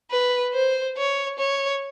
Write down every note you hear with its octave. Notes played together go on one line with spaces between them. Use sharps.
B4
C5
C#5
C#5